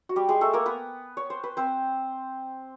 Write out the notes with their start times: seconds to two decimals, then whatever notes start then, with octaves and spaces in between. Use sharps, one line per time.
0.09 F#4
0.16 G3 G4
0.29 G#3 G#4
0.41 A3 A4
0.53 A#3 A#4
0.66 B3 B4
1.17 C#5
1.30 C5
1.44 B4
1.57 C4 C5